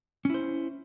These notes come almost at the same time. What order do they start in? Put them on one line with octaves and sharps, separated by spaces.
C#4 E4 C5